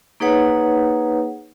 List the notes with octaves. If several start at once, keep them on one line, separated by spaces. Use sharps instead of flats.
A#3 D#4 G#4 B4 C#5 F#5